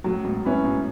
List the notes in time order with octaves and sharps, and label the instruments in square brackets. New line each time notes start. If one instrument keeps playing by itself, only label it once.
[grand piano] F#2 A2 [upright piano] F#3
[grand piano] G#2 B2
[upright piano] C#4 E4 B4
[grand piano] G#2 B2